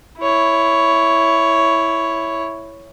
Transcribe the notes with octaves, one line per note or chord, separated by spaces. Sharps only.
E4 C#5